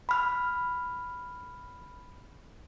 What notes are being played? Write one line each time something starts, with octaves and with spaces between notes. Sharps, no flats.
B5 F6